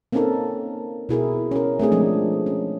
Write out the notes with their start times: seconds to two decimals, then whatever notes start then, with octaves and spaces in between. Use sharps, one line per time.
0.12 A#3 C4 C#4 D#4 A4 A#4
1.09 B2 E4 G#4 A#4
1.51 C#4 A#4
1.79 A3 C4 D4 G#4
1.92 F3 G#3 D4
2.46 C#4